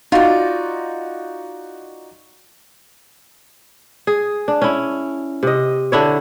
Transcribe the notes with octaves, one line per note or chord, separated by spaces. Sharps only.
D#4 F4 F#4 D5
G#4
D4
C#4 E4
C3 D#5
D3 D4 E4 C#5